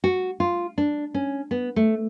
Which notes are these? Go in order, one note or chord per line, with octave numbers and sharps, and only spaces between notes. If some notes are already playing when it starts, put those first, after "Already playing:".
F#4
F4
D4
C#4
B3
A3